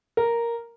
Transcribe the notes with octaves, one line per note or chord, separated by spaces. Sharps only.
A#4